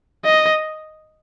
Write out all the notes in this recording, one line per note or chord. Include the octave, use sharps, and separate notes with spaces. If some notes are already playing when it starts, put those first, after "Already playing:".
D#5